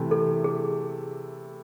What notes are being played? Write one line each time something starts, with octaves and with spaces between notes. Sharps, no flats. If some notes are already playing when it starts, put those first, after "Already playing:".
Already playing: C3 E3 A3
A4
G#4